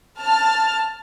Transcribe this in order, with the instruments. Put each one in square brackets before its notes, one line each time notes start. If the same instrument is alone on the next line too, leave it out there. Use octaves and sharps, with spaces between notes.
[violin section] A5 F6